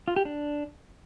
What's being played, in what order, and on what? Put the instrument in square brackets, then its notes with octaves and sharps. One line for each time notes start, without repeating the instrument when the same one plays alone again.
[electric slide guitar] F4
G4
D4